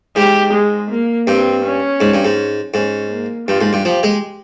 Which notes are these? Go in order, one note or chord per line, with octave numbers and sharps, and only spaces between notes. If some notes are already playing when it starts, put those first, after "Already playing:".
G#2 G4
G#3
A#3
G2 C4
C#4
G#2
G2
G#2
G#2 C#4
A#3
G2 F4
G#2
G2
F3 G4
G#3